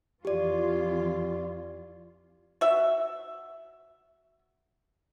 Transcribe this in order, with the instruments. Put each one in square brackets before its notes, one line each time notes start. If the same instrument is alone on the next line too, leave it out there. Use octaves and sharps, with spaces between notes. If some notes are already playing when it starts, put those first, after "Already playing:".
[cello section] F2 E3 F4 [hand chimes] G4 D5
[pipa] F#4 E5